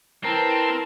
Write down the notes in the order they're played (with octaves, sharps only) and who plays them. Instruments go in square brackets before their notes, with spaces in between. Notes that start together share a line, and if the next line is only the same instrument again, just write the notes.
[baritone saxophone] E3 [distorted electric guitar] C4 [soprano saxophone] A#4 [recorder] A5